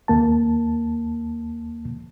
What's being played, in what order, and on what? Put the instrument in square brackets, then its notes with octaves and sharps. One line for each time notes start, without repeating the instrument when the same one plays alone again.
[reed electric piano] D#2 A#3 A5